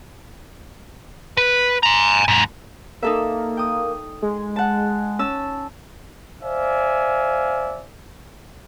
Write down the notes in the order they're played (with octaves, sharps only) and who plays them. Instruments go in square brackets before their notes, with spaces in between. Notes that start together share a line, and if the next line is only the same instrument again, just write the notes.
[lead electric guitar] B4
G#5 A#5
D#2 G#2
[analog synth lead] A#3 [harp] D#4 A4 E5
[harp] G5 D#6
[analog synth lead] G#3
[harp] F#5 A5
C#4 A5 E6
[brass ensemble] C5 D5 E5 F5 G#5